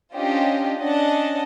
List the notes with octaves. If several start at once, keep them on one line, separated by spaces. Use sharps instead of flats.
C#4 D4 F4 G4 C5 D#5
C#4 D4 D#5 F#5 A5